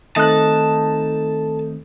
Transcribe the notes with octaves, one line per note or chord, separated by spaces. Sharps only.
D#3 A3 C4 D#4 A4 A5 F#6